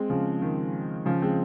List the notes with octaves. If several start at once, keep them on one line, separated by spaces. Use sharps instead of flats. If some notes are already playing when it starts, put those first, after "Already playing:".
Already playing: G#3 C4
C#3 F3
D#3
C#3 F3
G#3 C4